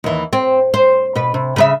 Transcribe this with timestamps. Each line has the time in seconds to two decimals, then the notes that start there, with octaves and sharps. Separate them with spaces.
0.04 D#2 E3
0.33 C4
0.74 C5
1.15 B2 B4
1.34 C3
1.56 C#3 B4 E5